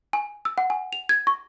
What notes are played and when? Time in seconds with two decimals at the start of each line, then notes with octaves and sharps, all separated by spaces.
0.13 G#5
0.45 E6
0.58 F#5
0.70 G#5
0.93 F7
1.09 G#6
1.27 C#6